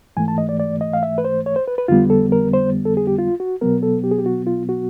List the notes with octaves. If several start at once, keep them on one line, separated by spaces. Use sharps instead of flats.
G#2 E3 A3 G#5
A5
D#5
D5
D5
D#5
F5
E5
B4
C5
C#5
C5
B4
B4
F2 D3 G3 B3 F4
A4
A#4
C5
A4
G#4
G4
F4
F#4
B2 F#3 B3 A#4
A4
G4
G#4
G4
F#4
F4
F#4